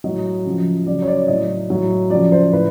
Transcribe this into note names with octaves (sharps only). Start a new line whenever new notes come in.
A2 F#3 D#5
C#3 F3
C#3 F#3 D5
C#5
D5
A2 F#3 D#5
A2 F#3
C#3 F3 D5
C5
A2 B4